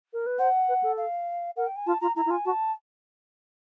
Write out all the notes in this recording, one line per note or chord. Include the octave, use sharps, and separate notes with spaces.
A#4
B4
C5 F#5
B4
A4
F5
A#4 F#5
G5
G#5
F4 A5
F4 A#5
E4 A#5
E4
F4 G#5
F#4 A5